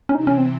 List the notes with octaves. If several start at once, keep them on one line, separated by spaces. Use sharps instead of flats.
C#4
C3 E3 C4 D#4
C#4
C4